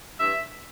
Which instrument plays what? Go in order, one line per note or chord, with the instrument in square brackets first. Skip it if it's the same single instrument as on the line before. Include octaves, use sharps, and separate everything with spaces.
[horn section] G2 E3 E5